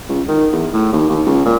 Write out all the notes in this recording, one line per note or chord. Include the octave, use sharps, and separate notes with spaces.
C#2
D#3
E2
A2
D#2
D#2
C#2
A#2